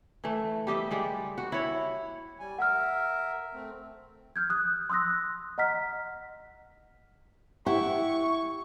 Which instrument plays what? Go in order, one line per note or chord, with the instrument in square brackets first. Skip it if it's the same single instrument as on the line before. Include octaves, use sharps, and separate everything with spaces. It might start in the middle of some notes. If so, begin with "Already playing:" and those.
[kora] E3 A3
G3 G4 D#5 E5
G3 G#3 G4 D5
F#4
E4 C#5
[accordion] G3 G#5
[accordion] A#4 E5 [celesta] F#5 F6
[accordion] A3 C4
[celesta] F6 G6 G#6
D#6 F#6
C6 D#6 E6 F#6 A#6
D#5 F#5 A#5 F6 B6
[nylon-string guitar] E4 G4 F#5 [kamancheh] C#6